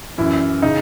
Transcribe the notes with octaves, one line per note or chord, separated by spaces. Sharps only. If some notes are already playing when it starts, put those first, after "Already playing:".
F#2 E3 E4
C#3 D#4